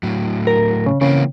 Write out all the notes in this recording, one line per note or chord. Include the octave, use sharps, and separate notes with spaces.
A2 F#3
A#4
C#3
C#3 E3 A#3 C4